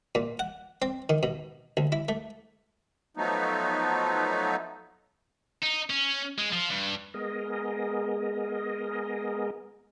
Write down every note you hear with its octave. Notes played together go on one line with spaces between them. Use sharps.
A#2
F#5
C4
D#3
B2
D2
E4
A3
F3 F#3 A3 B3 D#4
D#4
C#4
G#3
F3
G2
G#3 B3 G#4 A#4 D#5